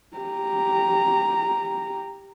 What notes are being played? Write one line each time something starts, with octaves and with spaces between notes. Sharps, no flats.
G4 A#5